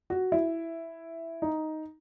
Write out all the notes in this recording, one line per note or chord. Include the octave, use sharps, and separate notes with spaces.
F#4
E4
D#4